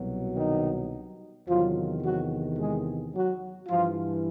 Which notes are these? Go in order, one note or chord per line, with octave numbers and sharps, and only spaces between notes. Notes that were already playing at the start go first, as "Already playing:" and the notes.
Already playing: C2 B2 F#3
D#3 D#4
E2 C3 D#3 F3 F#3 F4
F#3 F#4
G#3 G#4
F#3 F#4
G2 E3 F3 F4